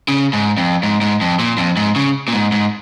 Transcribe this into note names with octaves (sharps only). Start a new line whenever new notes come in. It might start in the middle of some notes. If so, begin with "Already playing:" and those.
C#3
G#2
F2
G#2
G#2
F2
A#2
F2
G#2
C#3
A#2
G#2
G#2